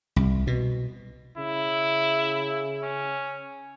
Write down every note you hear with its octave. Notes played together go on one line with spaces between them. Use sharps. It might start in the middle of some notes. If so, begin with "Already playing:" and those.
C2
B2
C#3 E4
C#4